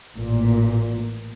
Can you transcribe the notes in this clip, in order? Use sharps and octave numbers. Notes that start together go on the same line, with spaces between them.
A1 A#2